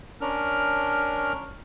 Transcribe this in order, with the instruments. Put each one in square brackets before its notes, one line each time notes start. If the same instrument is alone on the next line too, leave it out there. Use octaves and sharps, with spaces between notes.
[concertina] C#4 D4 A#4 F6